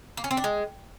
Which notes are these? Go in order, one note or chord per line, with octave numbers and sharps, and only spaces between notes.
A#3
C#4
C4
D4
G#3